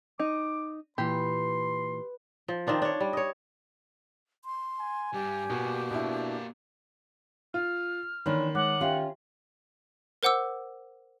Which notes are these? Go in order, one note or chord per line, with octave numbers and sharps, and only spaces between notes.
D#4 D6
A#2 E3 G4 B4 C6
F3
D#3 C4 D4 F4
D4 C#5
G3
C#5 D#5
C6
G#5
G2 G3 G4
B2 A#3 F#4
B2 D4 E4
F4 F6
D#3 E3 A#3 D4 C#5 B5 C6
G#3 C#5 F#5 D6 F#6
C#4 F4 G4 E5 G5
A#4 C5 F#5 D6 E6